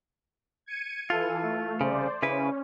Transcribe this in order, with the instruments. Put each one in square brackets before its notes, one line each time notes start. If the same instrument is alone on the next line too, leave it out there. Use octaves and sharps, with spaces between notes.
[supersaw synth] G#6 C#7 D#7
[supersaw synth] E3 A4 [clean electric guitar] F4
[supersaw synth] A3
[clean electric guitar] C2 G#2 C#3 [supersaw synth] C5 D5
[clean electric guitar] C#3 E4 B4 [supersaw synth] C#4